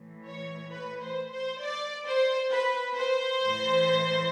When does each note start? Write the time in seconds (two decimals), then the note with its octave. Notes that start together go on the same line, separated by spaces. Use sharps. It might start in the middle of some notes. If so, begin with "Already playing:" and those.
Already playing: A2 E3
0.27 C#5
0.71 B4
1.02 C5
1.33 C5
1.63 D5
2.07 C5
2.52 B4
2.97 C5
3.43 A2 E3